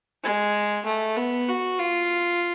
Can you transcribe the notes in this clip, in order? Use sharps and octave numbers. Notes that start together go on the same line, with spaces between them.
G#3
A3
B3
F#4
F4